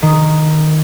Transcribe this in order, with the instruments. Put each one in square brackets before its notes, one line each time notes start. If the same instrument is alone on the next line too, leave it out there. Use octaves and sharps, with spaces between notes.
[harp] D#3